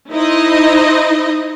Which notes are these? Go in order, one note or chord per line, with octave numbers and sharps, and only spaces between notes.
D#4 E4 C5 D#5